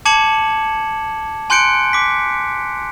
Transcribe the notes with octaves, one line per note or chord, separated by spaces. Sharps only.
A5 D6 G#6 C#7 E7 F#7
G#5 C6 F#6 G6 C#7 D7
D6 B6